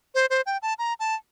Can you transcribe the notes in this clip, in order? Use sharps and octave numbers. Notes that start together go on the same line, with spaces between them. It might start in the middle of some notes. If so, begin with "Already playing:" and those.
C5
C5
G5
A5
A#5
A5